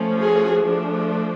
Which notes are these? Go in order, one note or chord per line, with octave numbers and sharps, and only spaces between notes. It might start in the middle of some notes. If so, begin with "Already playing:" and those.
Already playing: F3 A3 C#4
F#4 G#4
F3 A3 D4